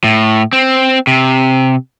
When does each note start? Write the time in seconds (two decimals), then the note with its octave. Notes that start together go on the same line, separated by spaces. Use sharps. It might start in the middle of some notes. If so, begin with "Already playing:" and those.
0.04 A2
0.53 C4
1.07 C3